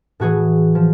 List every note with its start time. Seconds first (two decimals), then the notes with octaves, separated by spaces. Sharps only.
0.20 A2 E3 F#4 G#4
0.75 F3